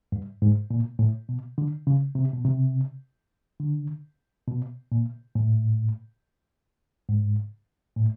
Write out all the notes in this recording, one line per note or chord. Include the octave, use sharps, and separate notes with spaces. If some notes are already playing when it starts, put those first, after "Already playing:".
G2
G#2
A#2
A2
B2
D3
C#3
C3
B2
C3
D3
B2
A#2
A2
G#2
A2